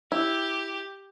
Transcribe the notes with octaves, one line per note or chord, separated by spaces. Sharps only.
E4 G4